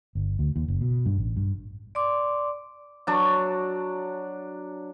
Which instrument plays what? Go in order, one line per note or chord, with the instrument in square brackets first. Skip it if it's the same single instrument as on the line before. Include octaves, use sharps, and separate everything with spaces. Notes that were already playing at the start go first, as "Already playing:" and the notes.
[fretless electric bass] G1
D2
D#2
F#1
B2
G2
A1
G2
[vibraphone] D5 C6 D6
[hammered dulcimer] F#3 D4